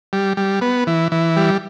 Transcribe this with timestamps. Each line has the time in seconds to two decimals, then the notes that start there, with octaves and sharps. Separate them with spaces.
0.13 G3
0.37 G3
0.61 B3
0.87 E3
1.12 E3
1.36 G3